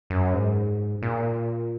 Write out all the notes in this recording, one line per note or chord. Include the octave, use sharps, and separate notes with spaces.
F#2
G#2
A#2